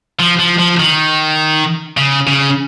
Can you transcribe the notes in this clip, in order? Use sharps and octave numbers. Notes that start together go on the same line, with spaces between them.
F3
F3
F3
D#3
C#3
C#3